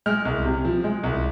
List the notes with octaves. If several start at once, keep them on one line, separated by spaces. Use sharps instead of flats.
G#3 F6
C2
C3
F3
G#3
C2